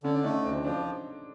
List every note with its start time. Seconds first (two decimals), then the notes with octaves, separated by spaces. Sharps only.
0.03 D3 C#4
0.14 D4
0.24 A3 C#4 D#4
0.44 D2 C4 D4
0.65 F3 C4 D4